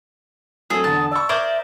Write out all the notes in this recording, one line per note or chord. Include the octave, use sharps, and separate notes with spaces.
F#3 A3 C4 G#4 A4 D#6
E2 D3 A5
D5 C#6 E6
A#4 C5 D5 E5 D#6 G6 G#6